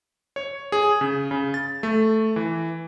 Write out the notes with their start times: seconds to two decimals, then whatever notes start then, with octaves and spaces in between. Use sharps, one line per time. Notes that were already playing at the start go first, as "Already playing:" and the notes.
0.36 C#5
0.72 G#4
1.01 C#3
1.31 C#3
1.54 A6
1.83 A3
2.36 E3